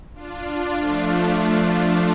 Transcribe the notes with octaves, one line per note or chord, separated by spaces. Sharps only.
D4 F4
F3 A3